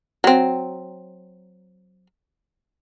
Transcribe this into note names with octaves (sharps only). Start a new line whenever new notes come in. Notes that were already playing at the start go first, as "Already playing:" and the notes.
F#3 C4